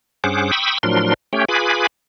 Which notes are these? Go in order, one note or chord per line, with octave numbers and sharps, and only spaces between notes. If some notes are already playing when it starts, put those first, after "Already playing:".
G2 C#4 G#4 C5 F#5 D6
G5 B5 C#6 D#6 E6
A2 F3 F#3 D4 A#4 C6
A3 C#4 G4 C#5 G5
F4 G#4 B4 G#5 B5 D6